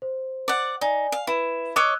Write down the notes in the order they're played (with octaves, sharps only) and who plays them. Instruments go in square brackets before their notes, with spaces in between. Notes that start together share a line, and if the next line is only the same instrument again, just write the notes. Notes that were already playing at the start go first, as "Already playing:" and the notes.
[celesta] C5
[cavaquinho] D5 F#5
[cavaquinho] D#4 [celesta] D5 G#5
[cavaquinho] F5
[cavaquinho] E4 [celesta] B4 E7
[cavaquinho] C#5 D#5 D6 [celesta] E6 F#6